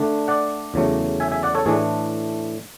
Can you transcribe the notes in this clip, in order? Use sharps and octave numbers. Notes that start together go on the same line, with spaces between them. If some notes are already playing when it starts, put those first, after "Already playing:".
Already playing: D3 A3 D4
D5 F#5
E2 C#3 F#3 A3
E5 G#5
E5 G#5
D5 F#5
A4 C#5
A2 E3 A3 D4 G#4